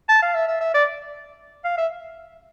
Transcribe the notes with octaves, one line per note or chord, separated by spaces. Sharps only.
A5
F5
E5
E5
E5
D5
F5
E5